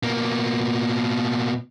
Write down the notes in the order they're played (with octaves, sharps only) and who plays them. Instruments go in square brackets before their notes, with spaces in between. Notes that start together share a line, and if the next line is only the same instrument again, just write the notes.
[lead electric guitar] B2 A#3